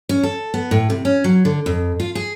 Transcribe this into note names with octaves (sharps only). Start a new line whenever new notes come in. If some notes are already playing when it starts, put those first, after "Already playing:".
C#4
A4
B3
A2
C3
C#4
F#3
D3
F2
F4
G#4